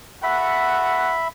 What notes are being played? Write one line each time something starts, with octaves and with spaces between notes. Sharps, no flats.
F#4 A4 E5 F#5 B5